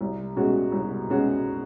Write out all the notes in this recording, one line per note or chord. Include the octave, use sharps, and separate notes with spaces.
C2
B2 G#3 C#4 F#4
C2
B2 G#3 C#4 F#4